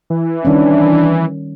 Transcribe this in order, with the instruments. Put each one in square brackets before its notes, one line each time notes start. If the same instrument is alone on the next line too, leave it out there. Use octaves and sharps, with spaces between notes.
[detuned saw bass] E3
[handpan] D#3 G3 C#4 [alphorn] D4